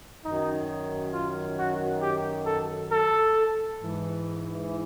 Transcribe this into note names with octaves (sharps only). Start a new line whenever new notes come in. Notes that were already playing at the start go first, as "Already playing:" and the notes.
F#2 D#3 F#3 D#4
F4
F#4
G4
A4
A4
G#2 E3